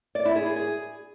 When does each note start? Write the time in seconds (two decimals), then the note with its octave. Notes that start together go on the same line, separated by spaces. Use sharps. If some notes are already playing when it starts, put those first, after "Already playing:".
0.15 D5
0.25 E4
0.36 G#4
0.46 G#4
0.56 G#4